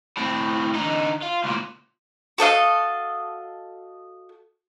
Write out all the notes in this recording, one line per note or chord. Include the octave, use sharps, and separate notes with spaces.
A2 C4
D3 D#4
F4
C#2 A#2
F#4 A4 D#5 F5